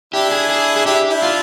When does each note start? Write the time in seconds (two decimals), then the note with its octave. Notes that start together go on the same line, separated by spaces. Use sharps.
0.13 D4 E4 G4
0.31 G#4
0.50 G#4
0.76 G#4
0.86 D4 E4 G4
1.10 D4 E4
1.22 F4